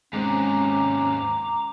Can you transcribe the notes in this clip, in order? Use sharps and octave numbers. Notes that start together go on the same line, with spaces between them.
D#2 G#2 G#3 C4 C#4 A#5 D6